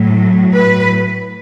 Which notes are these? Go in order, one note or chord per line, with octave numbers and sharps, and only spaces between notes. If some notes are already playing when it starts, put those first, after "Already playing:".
Already playing: A2 F#3
B4